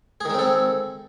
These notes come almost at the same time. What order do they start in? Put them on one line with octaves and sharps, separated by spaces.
G#4 D#3 G#3 C4 A4